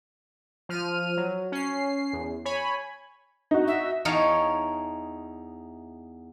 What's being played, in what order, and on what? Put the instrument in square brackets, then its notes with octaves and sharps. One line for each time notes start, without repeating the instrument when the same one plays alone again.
[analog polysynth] F3 F6 D#7
F#3
C#4 C7
E2
C#5 G#5 B5
[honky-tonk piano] D#4 F#4
[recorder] E5
[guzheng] E2 D#4 C#5 F5 A5